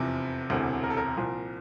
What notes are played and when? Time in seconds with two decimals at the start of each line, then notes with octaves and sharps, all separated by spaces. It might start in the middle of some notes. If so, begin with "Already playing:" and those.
Already playing: F1 E2 C3 F3
0.50 E1 D2 C3 E3
0.83 A#4
0.90 A4
0.97 A#4
1.16 C2 A#2 F3